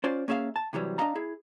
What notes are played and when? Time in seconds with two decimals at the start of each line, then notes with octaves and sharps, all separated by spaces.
0.04 C#4 F4 C5 D5
0.28 A#3 C#4 G#4 E5 F5
0.56 A5
0.73 C3 E3 F#3 G3
0.98 D4 D#5 F5 A#5
1.15 E4 G#4